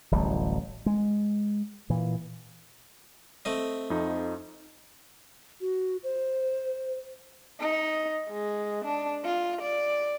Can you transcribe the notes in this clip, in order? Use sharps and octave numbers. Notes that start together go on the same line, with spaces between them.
D1 A1 G3
G#3
A#2 E3
A3 C4 D#5
F2 F3 D#4
F#4
C5
D#4
G#3
D4
F4
D5